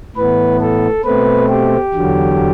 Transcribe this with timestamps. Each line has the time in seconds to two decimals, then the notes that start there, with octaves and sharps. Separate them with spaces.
0.16 A2 E3 B3 B4
0.61 A4
1.04 B2 A3 C4 B4
1.49 G4
1.94 E2 D3 F#3